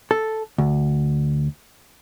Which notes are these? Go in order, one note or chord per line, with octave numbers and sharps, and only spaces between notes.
A4
D2